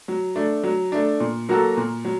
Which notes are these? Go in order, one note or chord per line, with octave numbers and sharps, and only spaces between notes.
F#3
A3 D4
F#3
A3 D4
A#2
F#3 A#3 F#4 A4
A#2
F#3